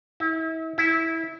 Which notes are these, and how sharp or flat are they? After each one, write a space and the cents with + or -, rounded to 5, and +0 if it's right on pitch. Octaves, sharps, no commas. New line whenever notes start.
E4 -35
E4 -15